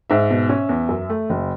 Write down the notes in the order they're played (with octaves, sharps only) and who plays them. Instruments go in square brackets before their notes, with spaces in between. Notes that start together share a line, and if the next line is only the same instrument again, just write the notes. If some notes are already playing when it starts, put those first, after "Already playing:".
[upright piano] G#2 E5
B2
C#4
E2
F#2
A3
F#1